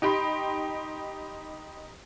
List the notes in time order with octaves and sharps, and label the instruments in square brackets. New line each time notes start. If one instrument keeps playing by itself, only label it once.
[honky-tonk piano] D#4 G4 G5 B5 C6